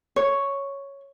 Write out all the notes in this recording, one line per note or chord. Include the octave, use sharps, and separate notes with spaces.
C#5